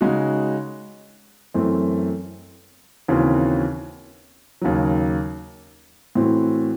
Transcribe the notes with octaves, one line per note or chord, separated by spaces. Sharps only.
C#3 G#3 D#4 F#4
F#2 E3 A3 C4
D#2 C#3 E3 C4 F#4
D#2 C#3 F#3
A2 E3 C4 F#4